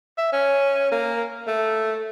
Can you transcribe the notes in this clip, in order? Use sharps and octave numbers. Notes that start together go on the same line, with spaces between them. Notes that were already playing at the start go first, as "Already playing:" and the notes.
E5
C#4
A#3
A3